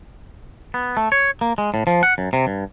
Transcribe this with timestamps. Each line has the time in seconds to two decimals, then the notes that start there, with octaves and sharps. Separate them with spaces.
0.74 B3
0.97 A3
1.12 C#5
1.41 A#3
1.58 G#3
1.74 A2
1.87 F3
2.03 F#5
2.18 F#2
2.33 C3
2.47 G2